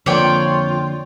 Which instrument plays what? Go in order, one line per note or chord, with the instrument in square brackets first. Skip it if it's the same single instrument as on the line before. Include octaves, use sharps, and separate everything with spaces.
[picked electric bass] F2 [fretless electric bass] D3 F3 A#3 [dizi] F4 [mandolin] C#5 D5 G5